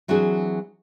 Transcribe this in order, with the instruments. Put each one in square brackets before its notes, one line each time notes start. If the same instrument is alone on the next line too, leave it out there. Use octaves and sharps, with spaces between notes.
[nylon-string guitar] E3 F#3 C4 D4 F#4 G#4